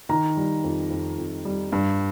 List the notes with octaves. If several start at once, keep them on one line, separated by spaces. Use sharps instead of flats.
D#3 A#5
G3
F2
F2
F2
G3
G2